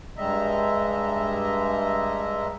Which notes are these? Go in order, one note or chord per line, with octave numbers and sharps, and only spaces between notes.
G2 G3 G#3 D#5 E5 A#5